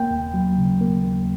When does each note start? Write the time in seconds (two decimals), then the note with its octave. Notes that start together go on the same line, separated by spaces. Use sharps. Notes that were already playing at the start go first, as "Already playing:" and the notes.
Already playing: A#3 G5
0.10 D#2
0.34 F#3
0.57 C#3
0.81 A#3
1.05 D#2